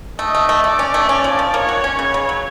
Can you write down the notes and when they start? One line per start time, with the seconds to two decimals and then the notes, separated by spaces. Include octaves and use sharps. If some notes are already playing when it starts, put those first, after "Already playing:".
0.19 A3 D#5
0.34 A3
0.49 A3
0.64 A3 D5
0.79 C#4
0.94 A3
1.09 C#4
1.24 F3
1.39 F3
1.54 A#3 C#5
1.69 F#4
1.84 C#4
1.98 C#3 C#5
2.14 C#3
2.29 F#3